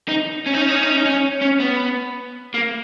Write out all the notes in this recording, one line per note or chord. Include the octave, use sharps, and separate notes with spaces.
D#4
C#4
D#4
C#4
D#4
C#4
D#4
C#4
D#4
C#4
C#4
B3
A#3